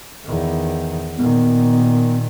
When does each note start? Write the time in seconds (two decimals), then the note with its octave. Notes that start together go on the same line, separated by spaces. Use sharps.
0.25 E2 D#3
1.17 A#2 D#3 B3